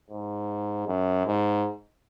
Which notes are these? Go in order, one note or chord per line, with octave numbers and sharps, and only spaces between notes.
G#2
F#2
G#2